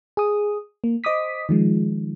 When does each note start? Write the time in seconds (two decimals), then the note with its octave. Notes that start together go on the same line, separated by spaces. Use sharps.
0.17 G#4 D#6
0.84 A#3
1.04 C5 D#5 D6 D#6 B6
1.49 D#3 F3 G#3